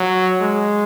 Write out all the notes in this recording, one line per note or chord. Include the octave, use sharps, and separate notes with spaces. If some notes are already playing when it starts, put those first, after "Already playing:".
Already playing: F#3
G#3